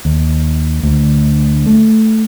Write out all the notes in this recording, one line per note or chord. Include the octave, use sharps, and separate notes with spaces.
D#2
D2
A3